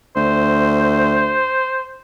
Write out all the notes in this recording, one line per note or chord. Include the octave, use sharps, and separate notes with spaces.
D2 C5